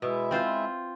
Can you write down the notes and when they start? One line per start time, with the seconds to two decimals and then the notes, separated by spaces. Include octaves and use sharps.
0.02 B2 G#3 E4 E5
0.31 C4 F4 C5